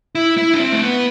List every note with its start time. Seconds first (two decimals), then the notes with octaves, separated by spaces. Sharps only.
0.15 E4
0.38 E4
0.54 D4
0.59 C4
0.73 A3
0.82 B3